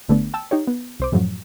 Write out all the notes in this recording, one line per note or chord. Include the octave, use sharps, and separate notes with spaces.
G#1 D3 A3 B3 D4
G5 A5 E6
D#4 G4 C#5
B3
C2 C5 D6
F#2 A2 F3 F#3